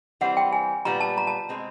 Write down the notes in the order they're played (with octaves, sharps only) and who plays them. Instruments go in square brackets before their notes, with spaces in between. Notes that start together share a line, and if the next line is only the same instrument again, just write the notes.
[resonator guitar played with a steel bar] E3 G3 C4 [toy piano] F#5
[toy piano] G5
G#5
[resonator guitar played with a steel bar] A#2 G3 B3 [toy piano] A#5
[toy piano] A5
A#5
A5
[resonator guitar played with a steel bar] B2 G#3 C4